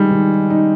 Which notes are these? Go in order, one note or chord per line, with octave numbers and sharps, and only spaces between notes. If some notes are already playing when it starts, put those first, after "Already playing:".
Already playing: D#3 G3 G#3 D#4
D#3
D#4